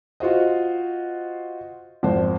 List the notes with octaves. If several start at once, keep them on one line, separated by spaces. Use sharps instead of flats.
F4 F#4 C5 D#5
G#1 F2 C5